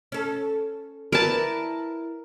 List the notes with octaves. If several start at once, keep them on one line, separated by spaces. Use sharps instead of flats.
C#4 A4
E4 A#4 B4 D5 A5